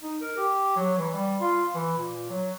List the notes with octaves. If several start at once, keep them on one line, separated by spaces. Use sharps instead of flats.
D#4
A#4
G4
F#3
E3
G3
F4
E3
A#2
F#3